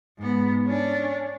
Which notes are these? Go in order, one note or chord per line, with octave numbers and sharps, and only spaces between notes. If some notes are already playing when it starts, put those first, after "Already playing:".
G#2 B3
C#4 D4